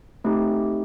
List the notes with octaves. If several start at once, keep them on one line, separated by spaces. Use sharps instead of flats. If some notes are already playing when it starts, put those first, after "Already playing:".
A3 C4 D#4 G4